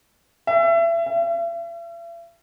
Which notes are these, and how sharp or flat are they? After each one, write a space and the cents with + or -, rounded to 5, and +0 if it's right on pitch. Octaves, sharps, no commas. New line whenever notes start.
E5 +30
E5 +45